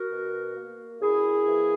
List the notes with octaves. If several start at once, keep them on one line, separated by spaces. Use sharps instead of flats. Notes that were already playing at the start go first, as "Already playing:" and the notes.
Already playing: F#4 A#4
B2
A#3
F#2 E4 G#4
E3 A#3